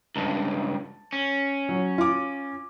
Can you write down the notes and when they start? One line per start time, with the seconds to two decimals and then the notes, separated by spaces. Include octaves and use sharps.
0.16 C#2 G2 A5
1.13 C#4
1.69 F#3
1.98 F4 D6